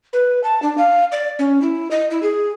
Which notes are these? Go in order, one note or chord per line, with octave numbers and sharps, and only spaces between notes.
B4
A5
D4
F5
D5
C#4
E4
D#5
E4
G#4